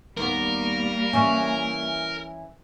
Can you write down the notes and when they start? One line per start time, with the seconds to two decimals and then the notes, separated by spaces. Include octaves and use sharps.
0.18 D#2 G3 A#3 B3 A#4
1.13 E3 C#4